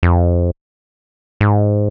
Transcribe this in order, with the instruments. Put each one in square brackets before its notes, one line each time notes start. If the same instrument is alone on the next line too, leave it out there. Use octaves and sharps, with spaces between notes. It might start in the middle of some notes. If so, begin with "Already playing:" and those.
[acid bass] F2
G#2